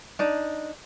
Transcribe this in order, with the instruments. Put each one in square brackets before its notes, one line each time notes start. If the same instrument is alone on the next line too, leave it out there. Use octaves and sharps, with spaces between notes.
[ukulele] D4 D#4